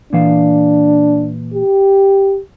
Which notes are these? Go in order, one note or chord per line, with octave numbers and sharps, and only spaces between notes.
A#2 E3 D4 F5
G4